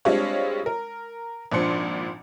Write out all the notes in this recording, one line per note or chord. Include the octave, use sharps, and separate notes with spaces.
G3 G#3 C4 D4 F4 C#5
A#4
G#1 A#2 F3 D4 C6 C#7